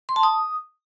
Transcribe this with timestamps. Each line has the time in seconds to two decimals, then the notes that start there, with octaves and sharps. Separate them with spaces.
0.09 C6
0.16 A5
0.23 D#6